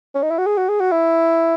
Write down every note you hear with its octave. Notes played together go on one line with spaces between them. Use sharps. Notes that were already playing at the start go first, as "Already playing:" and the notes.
C#4
D#4
E4
F#4
G#4
F#4
G#4
F#4
E4